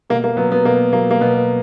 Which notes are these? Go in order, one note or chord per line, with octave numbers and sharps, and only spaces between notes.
B2 A#3
A#3
F#3 B3
B3
B2 A#3
F#3 A#3
A#3
B2 B3